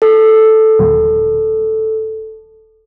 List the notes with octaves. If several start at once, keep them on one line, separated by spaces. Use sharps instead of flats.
A4
D#1